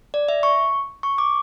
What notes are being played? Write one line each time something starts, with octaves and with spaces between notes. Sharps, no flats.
D5
E5
C#6
C#6
D6